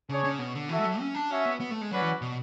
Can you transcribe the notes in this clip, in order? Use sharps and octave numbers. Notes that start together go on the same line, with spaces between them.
C#3 D4 G#4 C#5
C#3
B2
D3
E3 F#4 A4 E5
G#3
F#3
C#4
D4
C#4 F#4 C#5 E5
B3
B3
A3
G#3
F#3 C#4 F#4 B4 D5 F#5
E3
B2